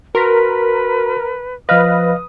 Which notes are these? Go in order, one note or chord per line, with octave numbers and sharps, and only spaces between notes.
F#4 A#4 B4 C6 B6
F3 B4 D#5 F5 D#6 F6 A#6